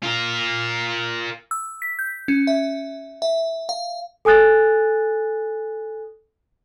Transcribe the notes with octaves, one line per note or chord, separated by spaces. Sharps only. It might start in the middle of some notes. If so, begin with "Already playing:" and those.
F4 A#4
E6
B6
G6
C#4
E5
E5
F5
A4 G#5 D#6 F#6 A6